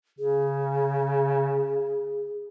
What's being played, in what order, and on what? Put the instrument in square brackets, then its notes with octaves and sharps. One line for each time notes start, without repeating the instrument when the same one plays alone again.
[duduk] C#3 [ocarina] G#4